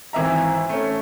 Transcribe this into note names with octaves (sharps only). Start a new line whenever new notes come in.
G#1 E3 C4 E5 A#5
A3 C#4